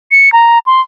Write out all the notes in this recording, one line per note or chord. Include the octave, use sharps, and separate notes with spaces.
C#7
A#5
C6